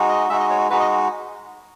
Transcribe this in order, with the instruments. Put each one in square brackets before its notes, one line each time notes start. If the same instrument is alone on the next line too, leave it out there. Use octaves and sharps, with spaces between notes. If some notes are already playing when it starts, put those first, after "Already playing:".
Already playing: [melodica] G#3 D#4 F#4
D#5
G#3 D#4 F#4 E5
D#5
C#5
G#3 D#4 F#4 B4
D#5